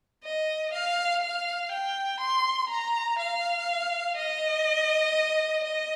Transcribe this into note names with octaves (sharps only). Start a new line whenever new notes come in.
D#5
F5
F5
G5
C6
A#5
F5
D#5
D#5